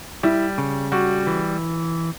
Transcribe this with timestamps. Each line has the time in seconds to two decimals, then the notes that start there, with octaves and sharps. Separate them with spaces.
0.23 G3 E4
0.58 C#3
0.92 G3 F#4
1.27 E3